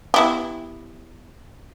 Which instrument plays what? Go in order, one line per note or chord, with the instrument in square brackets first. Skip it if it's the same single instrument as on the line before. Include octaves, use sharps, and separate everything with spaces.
[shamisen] B3 E4 G4